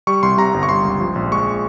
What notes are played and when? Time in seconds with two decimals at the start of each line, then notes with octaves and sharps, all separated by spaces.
0.07 G3 C#6
0.23 C2 C6
0.38 C3 A#5
0.54 G1
0.63 C#6
0.69 G3 C6
0.85 C#2
1.00 F3
1.16 A#1
1.32 G#3 C#6